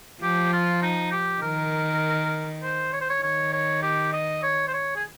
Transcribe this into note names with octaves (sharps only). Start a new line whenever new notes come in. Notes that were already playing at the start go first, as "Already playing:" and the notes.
F3 G4
F4
D#4
G4
D#3 A#4
C5
C#5
C5
C#5
D#3 C#5
C#5
G4
D#5
C#5
C5
C#5
G#4